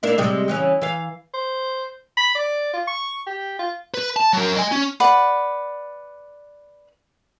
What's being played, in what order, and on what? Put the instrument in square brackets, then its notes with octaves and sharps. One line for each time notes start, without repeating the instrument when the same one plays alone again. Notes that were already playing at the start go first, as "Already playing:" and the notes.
[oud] A#3 D4 E4
C3 G3 G#3
C#3 E3 C#4
E3 F5
[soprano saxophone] C5
B5
D5
F4
C#6
G4
F4
[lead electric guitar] B4
A5
F#3 A#4
D#5 G#5
C#4
[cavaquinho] B4 D5 F#5